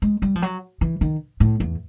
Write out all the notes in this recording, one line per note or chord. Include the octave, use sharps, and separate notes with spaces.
G#3
G3
F3
F#3
E3
D#3
A2
E2